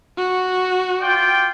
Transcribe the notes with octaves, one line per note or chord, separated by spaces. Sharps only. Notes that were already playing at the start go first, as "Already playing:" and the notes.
F#4
F4 D5 G5